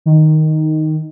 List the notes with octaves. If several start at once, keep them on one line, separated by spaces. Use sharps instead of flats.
D#3